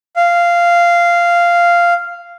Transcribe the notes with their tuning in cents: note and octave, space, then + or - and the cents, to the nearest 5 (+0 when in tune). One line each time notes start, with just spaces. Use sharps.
F5 -10